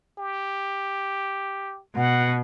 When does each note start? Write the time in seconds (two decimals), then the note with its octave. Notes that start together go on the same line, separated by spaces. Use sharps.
0.18 G4
1.96 B2 F#5